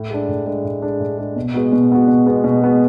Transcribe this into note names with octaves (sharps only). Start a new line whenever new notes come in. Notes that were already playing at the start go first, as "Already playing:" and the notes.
Already playing: A2
G#3 D4
A2
G#3 D4
A2
G#3 D4
A2
G#3 D4
B2
G#3 B3 F#4
B2
G#3 B3 F#4
B2
G#3 B3 F#4
B2
G#3 B3 F#4